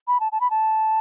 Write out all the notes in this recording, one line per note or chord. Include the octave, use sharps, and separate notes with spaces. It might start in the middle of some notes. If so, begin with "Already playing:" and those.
B5
A5
A5
B5
A5